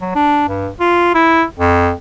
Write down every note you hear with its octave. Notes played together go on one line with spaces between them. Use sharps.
F#3
D4
G2
F4
E4
F2